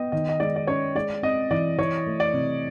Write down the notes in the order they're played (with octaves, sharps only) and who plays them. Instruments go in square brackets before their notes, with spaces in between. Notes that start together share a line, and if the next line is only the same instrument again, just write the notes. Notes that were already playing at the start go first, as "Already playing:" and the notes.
Already playing: [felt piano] B3 [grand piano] D#5 G5
[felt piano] D#3 [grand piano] D#5
[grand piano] D#5
[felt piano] G#3 [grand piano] D5
[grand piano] D5
[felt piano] C#4 [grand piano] C#5
[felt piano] G#3 [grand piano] D5
[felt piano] C4 [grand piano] D#5
[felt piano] E3 [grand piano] D5
[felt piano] E3 [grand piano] C#5
[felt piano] A3
[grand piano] D5
[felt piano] C3